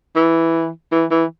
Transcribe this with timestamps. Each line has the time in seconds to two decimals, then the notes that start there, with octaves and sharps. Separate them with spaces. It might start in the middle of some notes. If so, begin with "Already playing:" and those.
0.16 E3
0.92 E3
1.11 E3